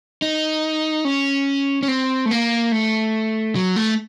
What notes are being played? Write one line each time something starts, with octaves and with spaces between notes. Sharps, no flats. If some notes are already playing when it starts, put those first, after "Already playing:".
D#4
C#4
C#4
C4
A3
A#3
A3
F#3
A3